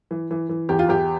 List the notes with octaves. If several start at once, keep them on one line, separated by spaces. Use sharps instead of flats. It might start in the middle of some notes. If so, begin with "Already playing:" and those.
E3
E3
E3
E2 G4
F4
E2 G4